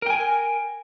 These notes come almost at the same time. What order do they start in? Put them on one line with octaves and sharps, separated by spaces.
A#4 G5 G#5